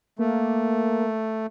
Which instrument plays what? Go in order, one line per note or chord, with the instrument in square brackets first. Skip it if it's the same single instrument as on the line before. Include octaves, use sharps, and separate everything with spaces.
[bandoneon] A3 [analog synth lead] A#3